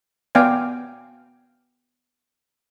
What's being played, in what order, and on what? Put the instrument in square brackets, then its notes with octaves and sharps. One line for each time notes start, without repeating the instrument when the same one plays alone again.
[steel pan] B3 D5 F5 G5 G#5